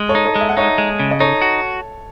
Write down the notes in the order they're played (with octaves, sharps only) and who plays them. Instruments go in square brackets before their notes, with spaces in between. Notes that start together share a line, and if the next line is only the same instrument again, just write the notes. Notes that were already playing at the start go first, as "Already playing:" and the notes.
Already playing: [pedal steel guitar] G#3
[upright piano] A4 C#5
[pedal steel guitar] D#4
[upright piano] A4 C#5
[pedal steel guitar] G#3
[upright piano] E5
F#5
[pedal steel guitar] D#4 [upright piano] C#5 E5
[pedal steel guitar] G#3
C#3
[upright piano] D#5
[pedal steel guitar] D#4 [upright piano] A4 C#5
[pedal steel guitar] F#4